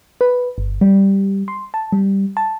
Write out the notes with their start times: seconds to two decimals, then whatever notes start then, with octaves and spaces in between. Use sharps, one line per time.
0.21 B4
0.58 G1
0.81 G3
1.48 C6
1.74 A5
1.92 G3
2.37 A5